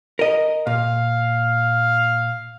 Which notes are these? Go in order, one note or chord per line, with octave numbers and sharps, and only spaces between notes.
A#4 D#5
A#2 F5